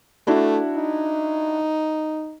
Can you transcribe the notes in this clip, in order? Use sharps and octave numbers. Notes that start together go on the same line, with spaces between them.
A3 D4 E4 F#4
D#4